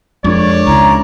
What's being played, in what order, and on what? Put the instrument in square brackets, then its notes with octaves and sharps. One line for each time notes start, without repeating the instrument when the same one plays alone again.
[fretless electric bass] F2 [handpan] G#3 D4 A#4 [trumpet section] C#5 D5
[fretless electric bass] C#2 [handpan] G#3 C#4 E4 [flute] A#5